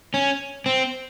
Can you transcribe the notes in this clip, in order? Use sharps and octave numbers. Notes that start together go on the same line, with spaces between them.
C#4
C4